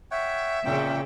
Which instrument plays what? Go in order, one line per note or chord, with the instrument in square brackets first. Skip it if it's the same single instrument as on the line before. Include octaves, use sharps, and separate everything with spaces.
[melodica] C#5 F#5 G5 [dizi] E5
[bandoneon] A#2 G5 [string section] C#3 [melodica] C4 C#4 F4